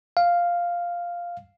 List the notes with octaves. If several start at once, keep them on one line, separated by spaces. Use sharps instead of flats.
F5